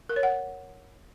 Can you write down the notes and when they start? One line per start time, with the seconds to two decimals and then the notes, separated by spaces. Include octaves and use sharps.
0.09 A#4
0.16 C#5
0.23 F#5